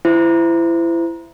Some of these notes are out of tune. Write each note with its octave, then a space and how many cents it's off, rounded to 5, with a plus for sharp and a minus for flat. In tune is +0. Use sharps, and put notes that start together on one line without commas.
E4 +25 C5 -30